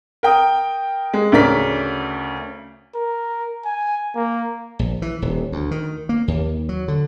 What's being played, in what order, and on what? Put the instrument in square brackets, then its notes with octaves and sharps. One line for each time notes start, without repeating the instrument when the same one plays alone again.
[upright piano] A#4 G5 D#6
G#3
D2 C#3 A#4 D5 B6
[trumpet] A#4
G#5
A#3
[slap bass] A#1
E3
D#1
D2
D#3
A#3
D#2
F#3
D3